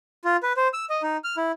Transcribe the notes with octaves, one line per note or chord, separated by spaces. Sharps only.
F4
B4
C5
E6
D#5
D#4
F6
E4